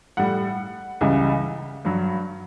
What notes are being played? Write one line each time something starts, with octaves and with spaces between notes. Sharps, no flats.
A2 G3 F#5
C#2 C#3 E3 G3
G2 F#3